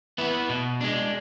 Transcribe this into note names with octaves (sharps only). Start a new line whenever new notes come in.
B3 E4 B4
B2
G#3 D4